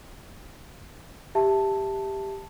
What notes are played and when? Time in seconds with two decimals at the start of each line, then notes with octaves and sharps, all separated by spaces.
1.35 G4 E5 A5